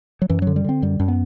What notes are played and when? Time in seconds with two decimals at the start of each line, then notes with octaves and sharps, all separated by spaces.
0.22 F#3
0.30 F#2 E3
0.42 F#3
0.47 D3
0.56 G3
0.64 D3 C4
0.82 F#2 G3
1.00 F#2
1.08 B3